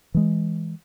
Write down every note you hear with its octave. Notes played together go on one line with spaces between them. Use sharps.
E3 G#3